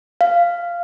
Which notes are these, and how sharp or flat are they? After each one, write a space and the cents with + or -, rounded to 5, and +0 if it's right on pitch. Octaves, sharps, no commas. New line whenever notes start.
F5 -10